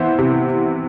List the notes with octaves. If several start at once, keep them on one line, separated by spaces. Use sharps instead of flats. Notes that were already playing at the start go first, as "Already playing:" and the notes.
Already playing: E3 B3 C5 E5
C3